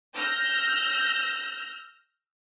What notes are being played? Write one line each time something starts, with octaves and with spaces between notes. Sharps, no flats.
E6 F6 G6 A#6